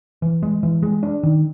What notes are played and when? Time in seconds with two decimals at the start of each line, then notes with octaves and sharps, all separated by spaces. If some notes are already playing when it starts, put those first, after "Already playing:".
0.22 E3
0.43 G#3
0.63 E3
0.83 G#3
1.03 D4
1.23 D#3